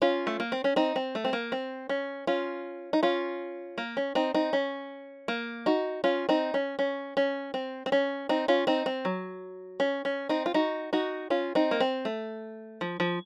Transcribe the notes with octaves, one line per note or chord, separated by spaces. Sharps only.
C#4 F4
A3
A#3
C4
C#4
C4 D#4
C4
A3
C4
A#3
C4
C#4
C#4 F4
D#4
C#4 F4
A#3
C#4
C4 D#4
C4 D#4
C#4
A#3
D#4 F#4
C#4 F4
C4 D#4
C#4
C#4
C#4
C4
C4
C#4
C4 D#4
C#4 F4
C4 D#4
C4
F#3
C#4
C#4
C4 D#4
F4
D#4 F#4
D#4 F#4
C#4 F4
C4 D#4
A#3
C4
A3
F3
F3